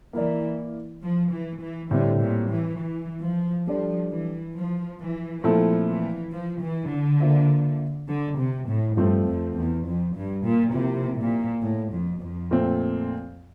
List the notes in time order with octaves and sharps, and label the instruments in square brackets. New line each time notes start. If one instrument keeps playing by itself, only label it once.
[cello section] E3 [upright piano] A#3 E4 A#4 D5
[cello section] F3
E3
E3
[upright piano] A2 G3 C4 [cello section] D3
[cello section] A#2
E3
E3
F3
[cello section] F3 [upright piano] G3 D4 A4 D5
[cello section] E3
F3
E3
[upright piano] A#2 A3 C4 E4 A4 [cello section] F3
[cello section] E3
F3
E3
D3
[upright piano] A#3 F4 C5 E5
[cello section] D3
C3
A2
[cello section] G2 [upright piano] F3 A3 C4
[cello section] F2
E2
F2
G2
A#2
[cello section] C3 [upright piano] F3 A#3 E4
[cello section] A#2
A2
F2
F2
[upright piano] A#2 A3 C4